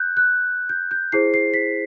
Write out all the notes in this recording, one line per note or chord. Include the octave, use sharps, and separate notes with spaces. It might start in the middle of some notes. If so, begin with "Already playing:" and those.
Already playing: F#6 G6
F#6
G6
G6
E4 G#4 C5 C7
C7
B6